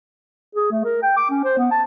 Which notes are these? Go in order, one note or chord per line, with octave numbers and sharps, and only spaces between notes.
G#4
A3
A#4
G5
D6
C#4
C5
B3
A5